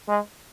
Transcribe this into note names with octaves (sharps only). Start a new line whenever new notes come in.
G#3